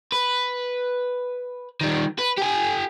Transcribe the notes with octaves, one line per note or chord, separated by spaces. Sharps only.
B4
D#3 G3
B4
G4 G#5